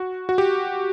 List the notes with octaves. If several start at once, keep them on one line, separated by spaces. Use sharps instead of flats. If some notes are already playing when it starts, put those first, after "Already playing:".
Already playing: F#4
F#4
G4